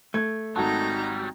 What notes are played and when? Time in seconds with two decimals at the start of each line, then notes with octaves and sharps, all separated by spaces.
0.14 A3 G#6
0.56 G#1 F#3 G3 D#4 F#4 A5 A#5